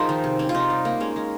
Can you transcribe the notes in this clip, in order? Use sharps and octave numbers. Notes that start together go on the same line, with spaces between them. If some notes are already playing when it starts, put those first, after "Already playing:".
Already playing: F3 D#4 G#4 A#4 C5
D#3
C3
C4 C#4
F4
C3 D#4
G3
A#3
G#3 C#4
G#3